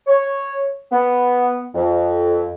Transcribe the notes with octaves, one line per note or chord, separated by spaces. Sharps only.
C#5
B3
F2